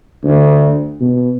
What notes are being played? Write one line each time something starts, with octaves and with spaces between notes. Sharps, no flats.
D2
B2